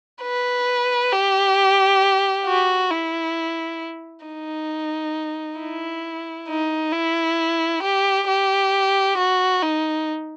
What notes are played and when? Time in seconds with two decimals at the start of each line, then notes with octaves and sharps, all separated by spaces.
0.22 B4
1.13 G4
2.47 F#4
2.91 E4
4.26 D#4
5.60 E4
6.49 D#4
6.93 E4
7.83 G4
8.28 G4
9.18 F#4
9.63 D#4